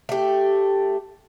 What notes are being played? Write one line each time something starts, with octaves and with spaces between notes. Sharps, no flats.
A3 G4